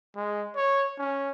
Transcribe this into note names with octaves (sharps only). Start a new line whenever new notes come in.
G#3
C#5
C#4